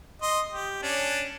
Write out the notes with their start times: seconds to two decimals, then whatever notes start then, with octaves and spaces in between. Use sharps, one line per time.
0.22 D#5 C6
0.51 G4
0.82 C#4 D4